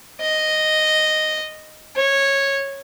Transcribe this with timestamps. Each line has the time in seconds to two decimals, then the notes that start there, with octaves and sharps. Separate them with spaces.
0.20 D#5
1.96 C#5